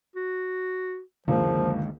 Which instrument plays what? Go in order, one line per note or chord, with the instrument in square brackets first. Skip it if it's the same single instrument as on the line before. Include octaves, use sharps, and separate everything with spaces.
[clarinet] F#4
[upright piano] F#1 C#2 A#3 [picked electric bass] D3 D#3 G#3 [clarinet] F3